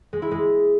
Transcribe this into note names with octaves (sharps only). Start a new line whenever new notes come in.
G#3
E4
G#3